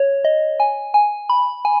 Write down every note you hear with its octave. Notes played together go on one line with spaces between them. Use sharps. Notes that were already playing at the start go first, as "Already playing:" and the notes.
Already playing: C#5
D#5
G#5
G#5
B5
G#5